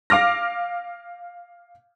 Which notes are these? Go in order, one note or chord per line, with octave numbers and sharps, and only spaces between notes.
F5 D6 F6 A#6